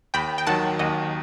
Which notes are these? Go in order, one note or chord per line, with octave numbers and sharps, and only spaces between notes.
D#2 G5 B5
G5
D#3 F#3 F#5 A5
D#2 D#5 F#5